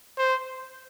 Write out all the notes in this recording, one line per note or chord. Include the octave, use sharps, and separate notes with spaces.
C5